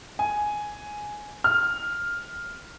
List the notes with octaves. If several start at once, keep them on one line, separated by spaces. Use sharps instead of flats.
G#5
F6